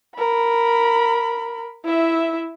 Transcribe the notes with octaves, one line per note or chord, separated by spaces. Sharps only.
A#4 B5
E4 E5